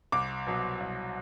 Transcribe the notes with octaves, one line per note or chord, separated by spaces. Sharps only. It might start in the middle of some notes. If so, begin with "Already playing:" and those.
C2 D6
B2 F#3
C2